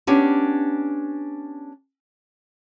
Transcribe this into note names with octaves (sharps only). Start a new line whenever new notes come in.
B3 C#4 D4 G4